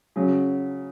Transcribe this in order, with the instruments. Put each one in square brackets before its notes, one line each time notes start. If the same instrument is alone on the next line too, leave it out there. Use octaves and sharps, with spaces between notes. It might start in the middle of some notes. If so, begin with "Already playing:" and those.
[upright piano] C#3 F#3 C#4